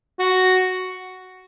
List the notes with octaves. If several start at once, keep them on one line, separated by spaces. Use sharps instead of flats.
F#4